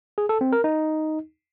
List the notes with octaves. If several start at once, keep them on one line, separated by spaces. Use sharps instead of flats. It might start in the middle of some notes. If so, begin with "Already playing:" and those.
G#4
A4
C4
A#4
D#4